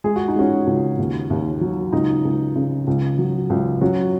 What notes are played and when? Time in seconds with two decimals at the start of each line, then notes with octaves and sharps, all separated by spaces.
0.04 G#3 G#4
0.16 F#4
0.28 D#4
0.36 G#3 C#4 F#4
0.67 C#2
0.99 D#2
1.30 D#2
1.61 F#3
1.92 C#2 D#4
2.25 C#2
2.56 C#3
2.87 C#2
3.19 F#3
3.50 C#2
3.81 F#3 C#4 F#4